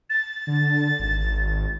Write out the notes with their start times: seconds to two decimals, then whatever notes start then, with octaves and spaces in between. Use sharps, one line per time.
0.10 A6
0.47 D3
0.99 G#1